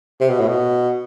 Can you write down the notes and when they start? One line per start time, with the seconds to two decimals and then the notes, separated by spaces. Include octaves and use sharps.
0.20 C3
0.30 B2
0.40 A2
0.48 B2